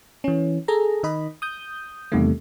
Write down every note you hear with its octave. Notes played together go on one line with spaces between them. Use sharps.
E3 C#4
G#4 A4 A#5
D#3 D#5 B5
D#6 G6
E2 C3 D#3 G3 A3